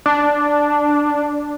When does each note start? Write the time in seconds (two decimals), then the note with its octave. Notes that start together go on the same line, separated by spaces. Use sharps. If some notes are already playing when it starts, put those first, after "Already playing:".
0.06 D4